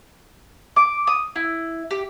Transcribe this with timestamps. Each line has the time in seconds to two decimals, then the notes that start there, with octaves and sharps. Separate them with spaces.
0.76 D6
1.07 D#6
1.36 E4
1.91 G4